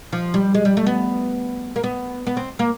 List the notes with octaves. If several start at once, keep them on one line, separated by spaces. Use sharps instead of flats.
F3
G3
G#3
G3
A3
B3
A#3
B3
B3
C4
A#3